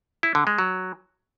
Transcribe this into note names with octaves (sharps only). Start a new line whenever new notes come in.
E4
D3
G#3
F#3